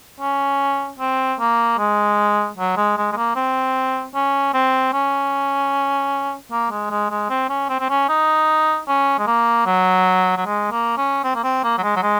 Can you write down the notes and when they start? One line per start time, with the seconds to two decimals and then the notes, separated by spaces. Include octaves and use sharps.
0.21 C#4
0.99 C4
1.40 A#3
1.78 G#3
2.58 F#3
2.77 G#3
2.97 G#3
3.12 G#3
3.17 A#3
3.35 C4
4.15 C#4
4.54 C4
4.93 C#4
6.51 A#3
6.71 G#3
6.90 G#3
7.11 G#3
7.30 C4
7.50 C#4
7.69 C4
7.80 C4
7.90 C#4
8.09 D#4
8.88 C#4
9.19 G#3
9.27 A#3
9.66 F#3
10.37 F#3
10.46 G#3
10.71 A#3
10.97 C#4
11.24 C4
11.35 A#3
11.44 C4
11.64 A#3
11.78 F#3
11.83 G#3
11.96 F#3
12.03 G#3